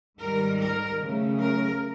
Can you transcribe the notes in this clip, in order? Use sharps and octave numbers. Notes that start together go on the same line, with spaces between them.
G#2 D#3 G3 A#4
A#4
C#3 F#3 A3
A#4